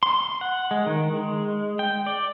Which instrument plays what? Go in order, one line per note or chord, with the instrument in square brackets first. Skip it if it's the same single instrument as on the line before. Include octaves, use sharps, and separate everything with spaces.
[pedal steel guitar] C6
F#5
G#3
D#3
G#3
G5
D5